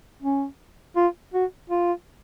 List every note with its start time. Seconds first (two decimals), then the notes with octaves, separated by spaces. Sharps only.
0.22 C#4
0.96 F4
1.33 F#4
1.70 F4